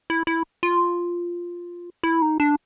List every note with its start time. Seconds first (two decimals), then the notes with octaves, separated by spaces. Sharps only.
0.10 E4
0.27 E4
0.63 F4
2.03 E4
2.22 D#4
2.40 D4